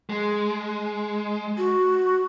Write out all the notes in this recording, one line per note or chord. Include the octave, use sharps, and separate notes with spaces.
G#3
F#4